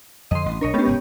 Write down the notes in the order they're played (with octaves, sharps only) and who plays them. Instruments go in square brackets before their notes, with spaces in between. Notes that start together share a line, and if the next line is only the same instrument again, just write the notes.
[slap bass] F2 D3 [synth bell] D#5 C6
[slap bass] A1 G2
[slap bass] B1 D4 [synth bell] A#4 C#5 D#5
[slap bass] A3 D4 [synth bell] B3 C#4 G4
[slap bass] F1 G#2 G#3